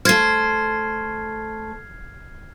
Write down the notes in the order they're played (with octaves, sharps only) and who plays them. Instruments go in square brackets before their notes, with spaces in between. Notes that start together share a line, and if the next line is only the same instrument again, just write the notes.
[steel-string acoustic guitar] A3 C5 [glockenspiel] F6 G#6 C7